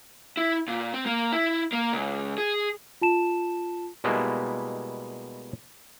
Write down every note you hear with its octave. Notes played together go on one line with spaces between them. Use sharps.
E4
A#2
C4
A#3
E4
A#3
C#2
G#4
F4 A5 E7
B2 G3 G#3 A#3 E4